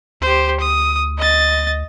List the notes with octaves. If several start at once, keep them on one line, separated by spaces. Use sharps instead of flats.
D2 G4 C5
D#6
D#5 A6